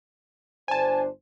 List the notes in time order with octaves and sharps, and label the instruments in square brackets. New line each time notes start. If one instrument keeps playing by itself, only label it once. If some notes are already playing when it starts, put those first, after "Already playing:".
[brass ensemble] G1 D4 C5 [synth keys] G#5 A5